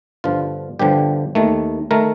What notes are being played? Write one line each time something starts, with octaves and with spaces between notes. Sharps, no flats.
G1 G2 D3 F3 F4
G1 G2 D3 F3 G4
D#2 D#3 A3
D#3 A3 A#4